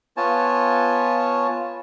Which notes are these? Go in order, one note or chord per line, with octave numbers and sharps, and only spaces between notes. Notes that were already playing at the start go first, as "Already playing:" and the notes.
B3 F4 C#5 G#5 A5